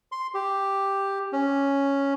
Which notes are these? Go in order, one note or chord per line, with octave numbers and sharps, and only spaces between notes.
C6
G4
C#4